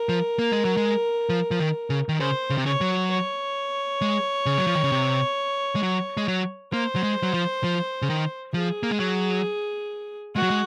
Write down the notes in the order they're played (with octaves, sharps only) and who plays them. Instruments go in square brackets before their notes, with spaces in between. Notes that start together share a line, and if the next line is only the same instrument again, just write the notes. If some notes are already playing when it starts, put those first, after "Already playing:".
Already playing: [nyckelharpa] A#4
[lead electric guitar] F3
A#3
G#3
F#3
G#3
F3
F3
D#3
C#3
D#3
[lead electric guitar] C#3 [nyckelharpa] C5
[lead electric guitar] C#3
C3
[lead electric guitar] C#3 [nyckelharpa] C#5
[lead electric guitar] F#3
[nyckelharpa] C#5
[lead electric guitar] G#3
C#3
F#3
F3
D#3
C#3
C3
G#3
F#3
G#3
F#3
[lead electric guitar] A#3 [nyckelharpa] C5
[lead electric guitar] F#3
G#3
F#3
F3
F3
C#3
D#3
[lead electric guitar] F3 [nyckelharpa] G#4
[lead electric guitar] A#3
G#3
F#3
[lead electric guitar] G#3 [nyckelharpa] F#4
[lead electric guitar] F#3
G#3